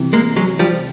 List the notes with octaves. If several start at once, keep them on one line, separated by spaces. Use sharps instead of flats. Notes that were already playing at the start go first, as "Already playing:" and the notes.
Already playing: C2 C3 E3
G#3 A#3
F#3 G#3
F3 G3